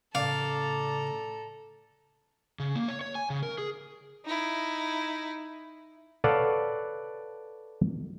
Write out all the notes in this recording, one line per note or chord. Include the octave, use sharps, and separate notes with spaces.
A2 C#3 A4 D5 F5 A#5
C#3
A#3
C#5
C#5
G#5
C#3
A#4
G#4
D#4 E4
A4 B4 C#5 D5 F5 F#5